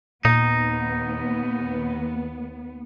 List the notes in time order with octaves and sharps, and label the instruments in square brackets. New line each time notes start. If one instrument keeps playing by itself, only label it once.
[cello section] D#2 B3 [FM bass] A#2 [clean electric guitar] D#4